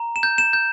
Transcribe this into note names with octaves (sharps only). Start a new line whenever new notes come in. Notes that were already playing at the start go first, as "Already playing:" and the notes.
Already playing: A#5
E7
G6
E7
G6